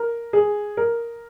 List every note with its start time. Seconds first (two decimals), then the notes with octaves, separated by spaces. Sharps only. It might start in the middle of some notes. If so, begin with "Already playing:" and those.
Already playing: A#4
0.33 G#4
0.77 A#4